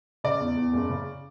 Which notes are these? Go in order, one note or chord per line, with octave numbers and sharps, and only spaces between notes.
C#3 D5
E2
E2
F#1
C#3